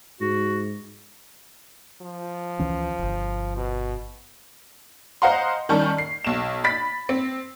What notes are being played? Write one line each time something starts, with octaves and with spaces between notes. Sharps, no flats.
G#2 F#4
F3
C#2 E3 C#4
D1 G1
B2
C5 D#5 F5 F#5 A#5 C6
D#3 G3 C#4 A5 C#6
C7
B1 E7
B5 A6 B6
C4